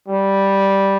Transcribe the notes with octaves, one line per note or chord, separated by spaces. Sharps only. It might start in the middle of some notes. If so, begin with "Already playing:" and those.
G3